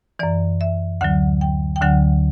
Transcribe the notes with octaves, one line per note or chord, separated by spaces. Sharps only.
F#2 E3 D5
E5
D2 D3 F#3 F#5
G5
G5
D2 D3 F#3 F#5